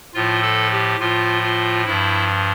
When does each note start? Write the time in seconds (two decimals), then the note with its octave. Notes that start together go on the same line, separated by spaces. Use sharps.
0.14 A2 F3 F4
0.42 A4
0.71 G4
0.99 A2 F3 F4
1.43 F4
1.85 G2 F3 E4